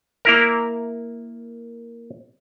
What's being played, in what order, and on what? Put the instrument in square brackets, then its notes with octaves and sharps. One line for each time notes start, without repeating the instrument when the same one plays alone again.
[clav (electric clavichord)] A#3 E4 A#4